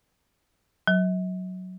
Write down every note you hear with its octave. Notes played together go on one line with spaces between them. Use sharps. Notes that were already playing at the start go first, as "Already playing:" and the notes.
F#3